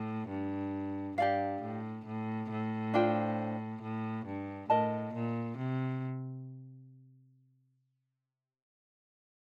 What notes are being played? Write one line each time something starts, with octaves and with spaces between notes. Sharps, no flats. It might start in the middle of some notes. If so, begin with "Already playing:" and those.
Already playing: A2
G2
G2 G4 D5 F5
A2
A2
A2
D4 F4 C5 G5
A2
G2
A2 A#4 D#5 A5
A#2
C3